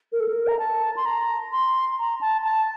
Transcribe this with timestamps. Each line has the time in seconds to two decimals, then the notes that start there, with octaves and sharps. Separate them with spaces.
0.12 A#4
0.20 A4
0.28 A#4
0.47 A#5
0.59 A5
0.96 C6
1.06 A#5
1.52 C6
1.99 A#5
2.21 A5
2.44 A5